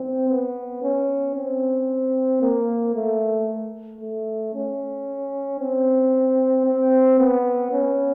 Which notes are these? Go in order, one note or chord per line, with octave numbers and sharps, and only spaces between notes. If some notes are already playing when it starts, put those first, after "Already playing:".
Already playing: C4
B3
C#4
C4
A#3
A3
A3
C#4
C4
C4
B3
C#4